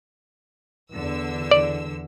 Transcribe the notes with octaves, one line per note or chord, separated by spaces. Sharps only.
E2 D3 E6
D5